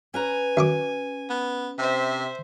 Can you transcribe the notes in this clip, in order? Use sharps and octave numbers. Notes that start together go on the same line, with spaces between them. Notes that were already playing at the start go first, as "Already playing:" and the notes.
C#4 B4 G#5 A#5
F#2 C#6 D6
B3
C3 C5 E5